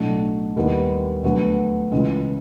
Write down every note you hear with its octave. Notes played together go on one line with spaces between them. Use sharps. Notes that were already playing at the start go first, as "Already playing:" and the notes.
Already playing: B1 A2 F#3 A3 D4
D#2 D#3 G3 B3 E4
D2 D3 F#3 B3
C#2 C#3 E3 G#3